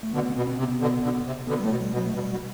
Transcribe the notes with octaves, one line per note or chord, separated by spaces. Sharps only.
A3
B2 D3 B3
B3
C4
B2
C4
C3
B3
B2 D3
B2 D3
C3
B2 D3 B3
G3
A2 A3
B2
G3
B2
F#3
A3
B2 G3
B2